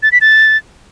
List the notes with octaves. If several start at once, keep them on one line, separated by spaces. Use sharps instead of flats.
A6
B6
A6